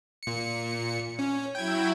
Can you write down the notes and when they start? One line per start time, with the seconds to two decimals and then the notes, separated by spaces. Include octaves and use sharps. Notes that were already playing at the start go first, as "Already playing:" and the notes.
0.23 A#2 C#7
1.19 C#4
1.55 F#3 E4 G5 G#6